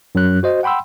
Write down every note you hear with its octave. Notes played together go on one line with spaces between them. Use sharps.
F#2 F#3 F#6
F#4 C5 D#5
F#5 G5 B5 C6 E6